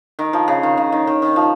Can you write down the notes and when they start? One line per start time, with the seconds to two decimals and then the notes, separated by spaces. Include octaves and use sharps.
0.19 D#3
0.33 F3
0.48 C#3
0.63 D#3
0.78 C#3
0.92 D#3
1.07 D#3
1.22 D#3
1.36 F3